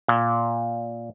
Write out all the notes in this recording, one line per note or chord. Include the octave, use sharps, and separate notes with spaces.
A#2